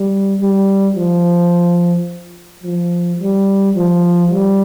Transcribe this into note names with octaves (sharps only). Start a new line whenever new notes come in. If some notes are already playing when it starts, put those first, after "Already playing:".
Already playing: G3
G3
F3
F3
G3
F3
G3